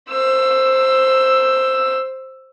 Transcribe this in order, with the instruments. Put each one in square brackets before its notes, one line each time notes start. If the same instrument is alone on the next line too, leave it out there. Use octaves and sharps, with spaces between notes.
[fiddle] C5 E6